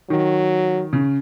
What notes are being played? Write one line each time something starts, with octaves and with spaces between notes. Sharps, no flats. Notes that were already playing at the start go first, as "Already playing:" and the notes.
D#3 F#3
C#3